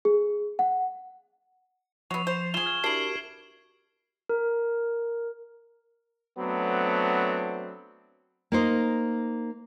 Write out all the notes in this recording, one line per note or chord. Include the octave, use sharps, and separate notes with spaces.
G#4
F#5
F3 F#3 B3 C#6
C5
F4 G#4 E7 G7
F6 G#6
D4 E4 F#4 G4 A#4 C7 D7 F#7
A#4
F#3 A3 B3 C4 D4
A#3 D#4 C5